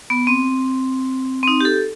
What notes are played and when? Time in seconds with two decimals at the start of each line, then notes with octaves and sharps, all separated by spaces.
0.10 B3
0.27 C4
1.43 C4
1.48 D#4
1.61 G4
1.65 A4